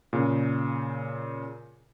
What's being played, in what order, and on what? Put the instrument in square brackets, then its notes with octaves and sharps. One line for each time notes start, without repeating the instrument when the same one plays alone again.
[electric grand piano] A#2 C#3